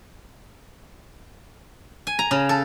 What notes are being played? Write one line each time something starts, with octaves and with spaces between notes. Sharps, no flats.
G#5
A#5
C#3
A4